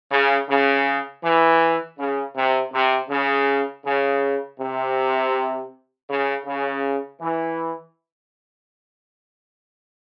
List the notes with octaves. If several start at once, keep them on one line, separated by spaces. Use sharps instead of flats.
C#3
C#3
E3
C#3
C3
C3
C#3
C#3
C3
C#3
C#3
E3